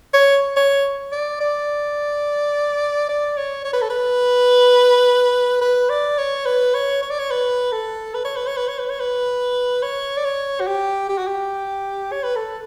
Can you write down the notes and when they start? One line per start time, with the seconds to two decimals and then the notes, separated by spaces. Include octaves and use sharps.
0.14 C#5
0.56 C#5
1.12 D5
1.41 D5
3.09 D5
3.37 C#5
3.65 C#5
3.73 B4
3.82 A4
3.90 B4
5.61 B4
5.90 D5
6.18 C#5
6.46 B4
6.74 C#5
7.02 C#5
7.10 D5
7.19 C#5
7.31 B4
7.72 A4
8.14 B4
8.25 C#5
8.36 B4
8.47 C#5
8.57 B4
8.68 C#5
8.79 B4
8.90 C#5
9.00 B4
9.83 C#5
10.17 D5
10.25 C#5
10.60 F#4
10.67 G4
11.09 G4
11.18 F#4
11.27 G4
12.12 C#5
12.23 B4
12.36 A4